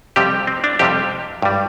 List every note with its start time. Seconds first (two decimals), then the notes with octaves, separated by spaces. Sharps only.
0.16 F2 C3 G3 G4
0.47 C4
0.64 D4
0.79 F2 C3 G3 G4
1.42 G2 G3